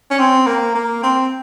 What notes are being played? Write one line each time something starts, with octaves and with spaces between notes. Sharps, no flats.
C#4
C4
A#3
A#3
C4